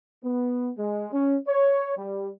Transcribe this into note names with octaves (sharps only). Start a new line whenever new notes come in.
B3
G#3
C#4
C#5
G3